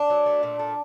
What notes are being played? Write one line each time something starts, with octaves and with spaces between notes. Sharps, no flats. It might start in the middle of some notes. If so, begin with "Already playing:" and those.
Already playing: D4
F#3
A3
A#2
A3